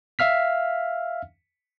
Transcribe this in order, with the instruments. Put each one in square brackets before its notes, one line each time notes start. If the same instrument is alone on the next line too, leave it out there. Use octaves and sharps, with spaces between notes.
[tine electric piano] E5 F5 F6 B6